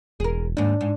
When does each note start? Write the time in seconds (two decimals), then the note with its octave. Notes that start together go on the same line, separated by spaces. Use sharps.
0.20 E1 G#4 A#4
0.57 D#2 G#2 D4
0.81 G#2